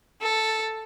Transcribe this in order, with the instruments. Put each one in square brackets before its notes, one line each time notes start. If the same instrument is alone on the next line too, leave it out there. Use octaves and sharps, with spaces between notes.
[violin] A4